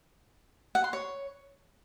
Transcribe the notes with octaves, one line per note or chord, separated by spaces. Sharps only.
F#5
C6
C#5